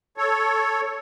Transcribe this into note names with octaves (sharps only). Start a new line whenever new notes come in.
A4 C#5